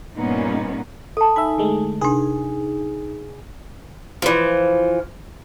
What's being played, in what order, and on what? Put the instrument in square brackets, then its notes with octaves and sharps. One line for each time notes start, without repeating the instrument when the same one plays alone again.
[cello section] G2 A#2 A#3 B3 C#4 D#4
[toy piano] A4 A5 [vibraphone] D#6
[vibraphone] D#4 G#5 [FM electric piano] E5 B5
[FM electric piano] D3 G#3 A3
[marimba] C3 D4 [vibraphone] D#4 [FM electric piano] G#4
[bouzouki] E3 F3